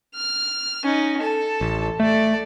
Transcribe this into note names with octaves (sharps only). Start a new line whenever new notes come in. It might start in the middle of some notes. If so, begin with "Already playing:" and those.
F6
C#4 D#4
A4 A5
A1
A3 A4 D5